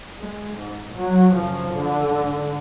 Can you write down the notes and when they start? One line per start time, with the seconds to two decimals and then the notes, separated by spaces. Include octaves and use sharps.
0.20 G#3
0.57 G#2
0.95 F#3
1.34 F#2 C#3 F3
1.71 D3
2.09 G#2